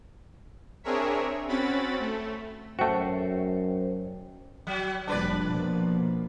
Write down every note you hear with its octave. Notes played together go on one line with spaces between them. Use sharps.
C4 D4 G#4 A#4 C#5 E5
C4 C#4 F#4 B5 A6
A3
F#2 A3 F#4 C5 G5
F#3
F1 A#2 G3 D4 B4 D5
B2 F3 A#3